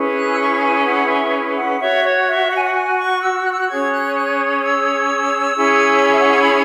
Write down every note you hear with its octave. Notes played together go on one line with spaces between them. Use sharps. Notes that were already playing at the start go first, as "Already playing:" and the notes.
Already playing: C#4 E4 G#4 B4
F#6
E6
C#6
G#5
F#5
E5
F#5
F#4 C#5 E5
C#5
E5
F#5
G#5
F#5
G#5
C#6
E6
F#6
E6
F#6
C#4 G#4 C#5 G#6
F#6
F#6
E6
C#4 E4 G#4 C#5
E5
F#5
G#5
B5